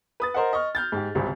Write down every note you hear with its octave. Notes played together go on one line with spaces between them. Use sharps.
B4 D#6 A6
A#4 C5 D#5 F#5
D#5 C#6 F6
F6 G6 A6
G#2 G4
G#1 C#2 C3 G3 C4